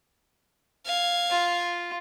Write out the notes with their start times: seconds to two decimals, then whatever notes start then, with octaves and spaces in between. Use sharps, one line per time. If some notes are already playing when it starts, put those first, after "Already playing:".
0.85 F5 G#6
1.30 F4